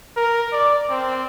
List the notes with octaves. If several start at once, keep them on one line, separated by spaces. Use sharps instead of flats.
A#4
D5
C4